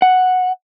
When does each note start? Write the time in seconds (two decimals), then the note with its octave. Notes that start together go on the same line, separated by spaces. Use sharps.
0.02 F#5